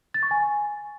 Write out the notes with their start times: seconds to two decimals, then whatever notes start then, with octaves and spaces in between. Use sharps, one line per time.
0.14 A6
0.23 C#6
0.31 G#5